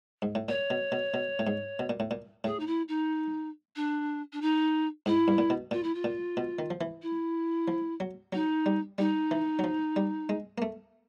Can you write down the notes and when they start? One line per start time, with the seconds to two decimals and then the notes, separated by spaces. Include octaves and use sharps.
0.22 G#2
0.35 A2
0.48 A#2 C#5
0.70 B2
0.92 B2
1.14 B2
1.39 A2
1.47 G#2
1.79 B2
1.89 A#2
2.00 A2
2.11 A#2
2.44 A2 G#4
2.59 D#4
2.66 E4
2.88 D#4
3.75 D4
4.32 D4
4.41 D#4
5.06 G#2 E4
5.28 G2
5.38 A#2
5.50 B2
5.71 A#2 F4
5.83 E4
5.94 F4
6.04 A#2
6.37 B2
6.59 D#3
6.70 F3
6.81 E3
7.02 E4
7.68 F3
8.00 F#3
8.32 F#3 D#4
8.66 G3
8.98 G3 D#4
9.31 E3
9.59 F#3
9.64 F3
9.96 G3
10.29 G#3
10.58 A#3
10.62 A3